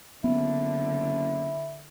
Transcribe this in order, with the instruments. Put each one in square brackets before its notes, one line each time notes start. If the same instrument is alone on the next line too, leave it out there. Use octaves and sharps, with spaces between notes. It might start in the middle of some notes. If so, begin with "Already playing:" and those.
[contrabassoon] F#1 [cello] D3 [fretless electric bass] B3 [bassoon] E4